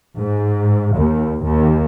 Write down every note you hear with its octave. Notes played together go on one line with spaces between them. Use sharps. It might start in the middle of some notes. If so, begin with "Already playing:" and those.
G#2
D#2
D#2